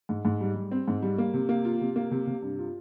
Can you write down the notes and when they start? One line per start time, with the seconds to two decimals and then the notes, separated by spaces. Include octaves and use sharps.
0.09 G#2
0.25 G#2
0.41 G3
0.56 G3
0.71 C4
0.88 G#2
1.02 G3
1.18 A#3
1.34 C3
1.49 A#3
1.65 F4
1.81 C3
1.96 A#3
2.11 C3
2.27 C3
2.42 G2
2.59 F4